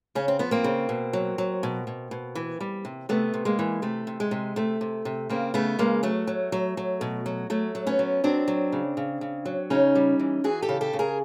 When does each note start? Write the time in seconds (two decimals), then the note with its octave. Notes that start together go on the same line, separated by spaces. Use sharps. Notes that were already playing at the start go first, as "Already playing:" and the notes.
0.15 C#3 C#4
0.28 C4
0.39 F3 B3
0.51 A#3 C4
0.64 C#3
0.89 B2
1.13 F#3
1.38 F#3
1.63 B2
1.87 B2
2.11 B2
2.35 E3
2.61 G3
2.85 C3
3.09 C3 A3 B3
3.34 C3
3.45 G#3 A#3
3.59 E3
3.82 C3 A3
4.07 C3
4.20 G#3
4.31 C3
4.56 C3 A3
4.81 C3
5.05 C3
5.29 C#3 A#3 C4
5.54 C#3 A3 B3
5.79 C#3 G#3 A#3
6.03 F#3 A3
6.27 F#3
6.52 F#3
6.77 F#3
7.01 B2
7.26 F#3
7.50 F#3 A3
7.75 F#3
7.87 B3 C#4
7.99 F#3
8.24 F#3 C4 D4
8.48 F#3
8.72 C#3
8.97 C#3
9.21 C#3
9.46 F#3
9.70 C#3 C#4 D#4
9.95 G3
10.19 E3
10.44 E3 F#4 G#4
10.62 G4 A4
10.69 C#3
10.81 G4 A4
10.93 C#3
10.99 G#4 A#4